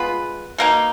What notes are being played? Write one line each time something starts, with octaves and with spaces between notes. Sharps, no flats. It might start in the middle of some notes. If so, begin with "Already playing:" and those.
Already playing: G#3 B3 F4 B4
B2 A#3 D#4